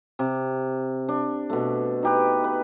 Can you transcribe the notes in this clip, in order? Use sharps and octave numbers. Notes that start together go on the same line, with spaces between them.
C3
D4
B2 A3
D#4 G4 B4
B4